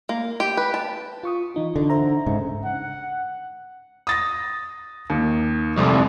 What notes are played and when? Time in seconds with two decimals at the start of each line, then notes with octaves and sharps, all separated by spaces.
0.09 A#3
0.40 G4
0.57 B4
0.74 A5
1.23 F4 C#6 D#6
1.55 E3 D#4 F4
1.76 D3
1.90 C5 E5 A#5
2.26 G#2 C#3
2.64 F#5
4.07 D#6 A6 A#6
5.10 D#2 D#3
5.78 C2 F2